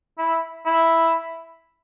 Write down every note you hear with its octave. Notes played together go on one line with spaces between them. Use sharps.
E4
E4